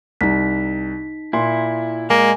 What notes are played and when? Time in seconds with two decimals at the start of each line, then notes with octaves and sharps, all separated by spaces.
0.21 C2 D#4 A#5 B6
1.33 A#2 E4 C6
2.10 G#3 A#3 G#5